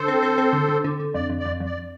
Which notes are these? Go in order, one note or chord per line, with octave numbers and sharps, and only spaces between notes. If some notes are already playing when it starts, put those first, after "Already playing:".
Already playing: D3 A4 C5
C4
C4
C4
D3
D3
D3
D3
F2 D5
F2
D5
F2
F2
D5